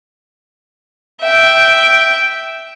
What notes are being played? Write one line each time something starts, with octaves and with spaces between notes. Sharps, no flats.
E5 G5